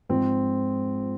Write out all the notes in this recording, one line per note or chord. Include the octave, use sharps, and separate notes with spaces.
G#2 F3 G#3 C4